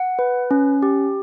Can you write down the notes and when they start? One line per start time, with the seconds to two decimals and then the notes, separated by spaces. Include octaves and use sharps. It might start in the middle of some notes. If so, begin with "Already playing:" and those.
Already playing: F#5
0.19 B4
0.51 C#4
0.83 G4